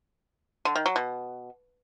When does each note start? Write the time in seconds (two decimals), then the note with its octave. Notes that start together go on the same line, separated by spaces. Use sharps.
0.65 D3
0.75 D#3
0.86 F#3
0.96 B2